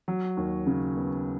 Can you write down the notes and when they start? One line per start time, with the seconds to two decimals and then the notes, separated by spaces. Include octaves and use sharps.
0.08 F#3
0.37 D#2
0.67 C#3
0.97 B3